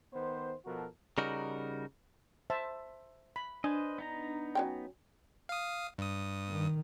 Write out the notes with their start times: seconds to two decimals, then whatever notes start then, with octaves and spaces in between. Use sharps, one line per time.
0.13 D#3 B3 C5
0.65 B2 F3 F#4 A4 A#4
1.18 C#3 G3 D#4 F#4 A#4
2.50 C5 E5 A5
3.36 B5
3.64 D4 B4 C5 D#5 G#5
3.98 B3 D#4 A#5
4.55 F#3 C#4 G5
5.49 F5 D#6
5.98 G2 D#6
6.49 D#3